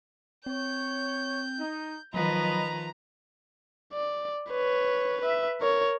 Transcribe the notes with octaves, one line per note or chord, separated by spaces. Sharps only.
C4 C#5 G6
D#4
D#3 F3 F#3 B4 D#5 A#5 B5
D5
B4 C#5
B4 E5
A#4 C#5